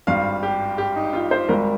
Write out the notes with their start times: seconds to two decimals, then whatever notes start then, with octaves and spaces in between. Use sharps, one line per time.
0.07 G#1 G2 G3 F5
0.43 G4
0.78 G4
0.96 D#4
1.13 F4
1.31 C5
1.49 G#1 G#2 G3 A#4